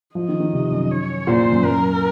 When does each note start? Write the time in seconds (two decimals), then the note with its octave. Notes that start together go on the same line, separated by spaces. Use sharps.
0.15 F3 D#5
0.29 D#3
0.40 D#3
0.53 C3
0.71 F#2
0.90 C#5
1.27 A#2 C5
1.52 F#2
1.65 F#2 A#4